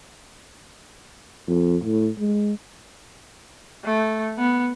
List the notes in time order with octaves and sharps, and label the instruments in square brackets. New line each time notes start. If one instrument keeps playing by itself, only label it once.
[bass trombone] F2
A2
G#3
[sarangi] A3
B3